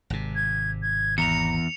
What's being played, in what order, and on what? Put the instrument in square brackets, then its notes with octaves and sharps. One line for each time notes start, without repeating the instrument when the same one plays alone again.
[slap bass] G#1 C3
[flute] G#6
G#6
[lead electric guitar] E2 [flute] A#5 [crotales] C#7 F7